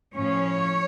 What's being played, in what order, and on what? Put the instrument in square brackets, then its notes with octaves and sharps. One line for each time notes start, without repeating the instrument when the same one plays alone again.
[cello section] A2 F3 C#4 C#5